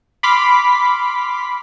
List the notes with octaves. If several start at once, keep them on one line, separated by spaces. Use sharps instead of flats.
B5 C6 D6 F6 B6